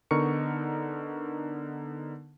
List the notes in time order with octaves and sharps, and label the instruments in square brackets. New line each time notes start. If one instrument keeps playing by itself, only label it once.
[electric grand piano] D3 B3 D#4 A#4 C#6 C#7